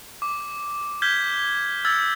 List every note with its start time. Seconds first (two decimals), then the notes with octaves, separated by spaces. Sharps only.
0.22 D6
1.02 F6 G6 G#6 B6 G7
1.85 E6 F6 G#6 A6